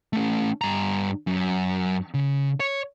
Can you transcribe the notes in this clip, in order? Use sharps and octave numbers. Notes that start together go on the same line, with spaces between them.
A3 C#4
G2 A#5
F#2
C#3
C#5